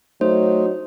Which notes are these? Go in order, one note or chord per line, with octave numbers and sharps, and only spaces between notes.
F#3 A3 D#4 C5